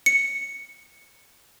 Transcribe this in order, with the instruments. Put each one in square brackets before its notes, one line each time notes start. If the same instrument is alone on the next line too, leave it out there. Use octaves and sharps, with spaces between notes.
[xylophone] C#7